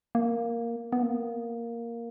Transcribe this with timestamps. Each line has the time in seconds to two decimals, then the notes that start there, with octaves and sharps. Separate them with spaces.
0.15 A#3
0.92 B3
1.02 A#3